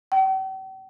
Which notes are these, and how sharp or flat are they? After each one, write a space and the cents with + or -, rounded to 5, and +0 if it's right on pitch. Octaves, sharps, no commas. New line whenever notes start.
G5 -45